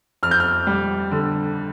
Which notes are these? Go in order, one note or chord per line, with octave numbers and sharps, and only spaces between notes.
F2 F6
G6
F6
G3
D3